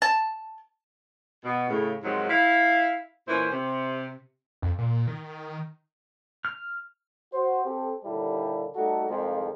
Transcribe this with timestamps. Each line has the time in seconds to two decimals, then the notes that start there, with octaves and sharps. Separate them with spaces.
0.02 A5
1.44 B2
1.69 A2 C#3
2.03 G#2 C3 D#3 F3 F#3
2.29 E4 F5
3.28 A#2 E3 C#4 E4 C5
3.51 C3
4.62 F2
4.78 A#2
5.07 D#3
6.45 F6
7.34 F#4 C5
7.65 C4 G4 A4
8.05 D#2 A#2 D3 G3 E4 A4
8.75 G3 A3 D#4 F#4 A4
9.08 C2 F2 D#3 F3 G#3